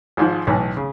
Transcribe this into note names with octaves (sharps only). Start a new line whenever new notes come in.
G#1 G#2 F3
B1 A2 E3
C#3